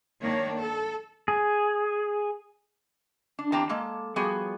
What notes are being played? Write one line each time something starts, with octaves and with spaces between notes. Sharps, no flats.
D#3 A#3 D4 C#5
A4
G#4
D4
E2 C4 G4 G5 A5 A#5
G#3 A#3 A4
F3 G3 B3 F#4 G#4